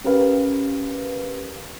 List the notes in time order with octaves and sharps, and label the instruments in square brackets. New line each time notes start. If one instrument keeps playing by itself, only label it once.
[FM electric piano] C#4 G4 A#4 B4 F5